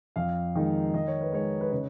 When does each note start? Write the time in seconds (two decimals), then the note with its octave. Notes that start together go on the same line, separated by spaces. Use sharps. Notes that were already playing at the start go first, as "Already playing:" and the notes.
0.16 F2 F5
0.55 D#3 G#3 D#4
0.94 D#3 D#5
1.07 C#5
1.21 B4
1.32 G#3 D#4 C#5
1.61 B4
1.72 C#3 C#5